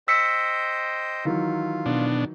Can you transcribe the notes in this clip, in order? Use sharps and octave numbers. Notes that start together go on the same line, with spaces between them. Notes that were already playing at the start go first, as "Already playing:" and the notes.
C5 D#5 G5 E6 B6 C#7
D#3 E3 F#3 F4
B2 D4